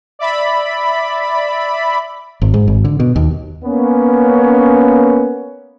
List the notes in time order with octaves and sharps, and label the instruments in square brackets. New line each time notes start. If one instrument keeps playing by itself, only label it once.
[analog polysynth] D5 E5 B5
[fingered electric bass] G#1
G#2
G#1
D3
B2
D#2
[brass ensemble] A#3 B3 C#4